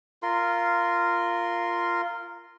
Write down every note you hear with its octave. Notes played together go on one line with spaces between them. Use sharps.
F4 A#4 C6